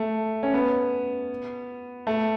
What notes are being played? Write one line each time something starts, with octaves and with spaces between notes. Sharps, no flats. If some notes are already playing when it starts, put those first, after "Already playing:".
Already playing: A3
C#4
B3
A3